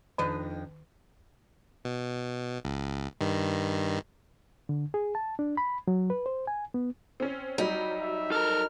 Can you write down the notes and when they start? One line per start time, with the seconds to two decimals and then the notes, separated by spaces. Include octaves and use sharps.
0.18 F2 D#3 D4 D#4
1.85 B2
2.65 C#2
3.21 G2 D#3
4.69 D3
4.94 G#4
5.15 A5
5.39 D4
5.57 B5
5.88 F#3
6.10 B4
6.26 C5
6.47 G#5
6.74 B3
7.20 C4 C#4
7.58 F#3 G3 D#4
8.02 E5
8.32 A4 A#4 F6